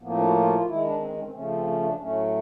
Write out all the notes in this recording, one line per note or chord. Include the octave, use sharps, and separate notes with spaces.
A2 F3 A#3 B3
C4
D4
F#4
F4
F#4
F4
D#3 G#3 E4
D4
C4
C#4
C4
C#3 F3 A3 C#4
C4
C#4
D4
A2 F#3 A3 C#4